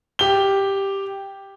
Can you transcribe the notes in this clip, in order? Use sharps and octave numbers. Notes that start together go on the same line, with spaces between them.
G4 G7